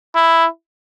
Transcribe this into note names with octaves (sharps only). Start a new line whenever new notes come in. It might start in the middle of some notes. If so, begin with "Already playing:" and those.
E4